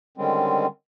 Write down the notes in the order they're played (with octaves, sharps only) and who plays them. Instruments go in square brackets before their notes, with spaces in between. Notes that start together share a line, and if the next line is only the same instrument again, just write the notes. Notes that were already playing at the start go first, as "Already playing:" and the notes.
[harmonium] D3 D#3 G3 G#3 C4 C#4